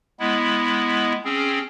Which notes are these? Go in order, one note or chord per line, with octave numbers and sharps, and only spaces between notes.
G#3 B3 E4
C4 C#4 G#4